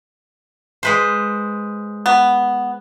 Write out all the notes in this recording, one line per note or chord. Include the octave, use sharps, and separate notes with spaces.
G#3 B4 C5
B3